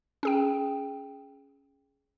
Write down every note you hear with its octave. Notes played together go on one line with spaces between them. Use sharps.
C#4 G#4 G5